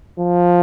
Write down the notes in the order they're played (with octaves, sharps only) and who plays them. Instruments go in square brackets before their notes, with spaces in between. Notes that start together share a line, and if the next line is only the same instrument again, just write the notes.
[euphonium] F3